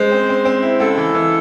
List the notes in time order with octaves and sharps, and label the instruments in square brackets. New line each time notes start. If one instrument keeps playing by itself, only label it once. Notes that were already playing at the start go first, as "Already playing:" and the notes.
Already playing: [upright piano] G#3 [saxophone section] C5
[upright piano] C4
C4
C4
E4
[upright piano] C#2 [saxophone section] A4
[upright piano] E3
E3